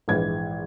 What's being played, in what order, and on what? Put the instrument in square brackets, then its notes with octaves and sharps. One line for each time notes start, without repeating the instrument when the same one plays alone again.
[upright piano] A#1 G#2 E3 G#6